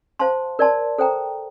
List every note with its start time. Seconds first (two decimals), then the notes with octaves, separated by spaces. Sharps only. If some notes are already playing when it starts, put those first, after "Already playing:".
0.19 C5 F5 A5 C6
0.59 A#4 D5 A5 C6
0.98 A4 C5 G5 A#5